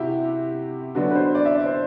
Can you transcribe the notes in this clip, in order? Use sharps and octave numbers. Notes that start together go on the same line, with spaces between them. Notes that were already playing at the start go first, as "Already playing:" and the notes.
Already playing: C3 E4 F#4 G4
D3 F#3 B3 D4 F#4
B4
C5
D5
E5
D5
C5